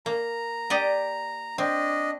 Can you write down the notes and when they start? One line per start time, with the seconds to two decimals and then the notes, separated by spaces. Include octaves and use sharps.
0.06 A#3 A#5
0.70 G4 D5 D#5
1.58 C4 D4 D#5